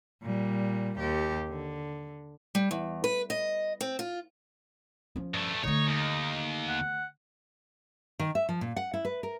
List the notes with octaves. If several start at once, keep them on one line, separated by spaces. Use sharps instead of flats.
A#2 G3
D#2 G4
D3
G3
E2
B4
D#5
C4
F4
F3 C#4
G2 A3
D3 A3 D#4 C#5
D#2
F#5
D#3
E5
F3
A#2
F#5
E4
B4
A#4